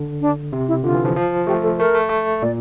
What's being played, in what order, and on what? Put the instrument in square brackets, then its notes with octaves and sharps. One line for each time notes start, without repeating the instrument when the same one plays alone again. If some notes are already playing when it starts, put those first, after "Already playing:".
Already playing: [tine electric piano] D3
[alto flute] D4
[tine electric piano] C3
[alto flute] E4
[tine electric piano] D3 [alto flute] F4
[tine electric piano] E3
F3
F3
[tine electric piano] A3 [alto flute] G4
[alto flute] A4
[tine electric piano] A3 [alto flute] A#4
[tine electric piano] A3
A3
[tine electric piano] A#2 [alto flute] D5